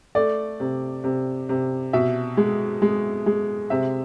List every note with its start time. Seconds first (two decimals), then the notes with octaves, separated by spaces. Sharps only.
0.15 A3 D5
0.60 C3
1.04 C3
1.49 C3
1.93 B2 E5
2.37 G#3
2.82 G#3
3.26 G#3
3.70 C3 E5